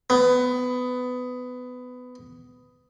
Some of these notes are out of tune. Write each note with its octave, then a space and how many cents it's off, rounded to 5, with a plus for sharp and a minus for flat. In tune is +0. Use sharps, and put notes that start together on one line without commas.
B3 +20